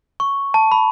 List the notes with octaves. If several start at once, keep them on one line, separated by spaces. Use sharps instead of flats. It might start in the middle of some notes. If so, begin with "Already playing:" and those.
C#6
A5
B5